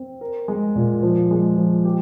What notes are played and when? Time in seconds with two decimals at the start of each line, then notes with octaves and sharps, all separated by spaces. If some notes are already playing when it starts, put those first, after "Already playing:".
Already playing: C4
0.21 A#4
0.48 G#3
0.75 A#2
1.03 F3
1.31 G#3
1.58 F3
1.85 G4